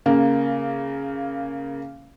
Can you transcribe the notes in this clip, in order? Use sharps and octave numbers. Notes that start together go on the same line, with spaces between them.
C#3 A#3